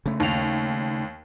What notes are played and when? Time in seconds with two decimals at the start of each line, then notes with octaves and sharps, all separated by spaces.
0.06 C#3 A3
0.20 D#2 F7